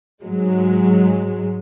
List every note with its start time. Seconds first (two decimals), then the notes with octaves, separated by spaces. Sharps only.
0.23 G#2 F#3 G#3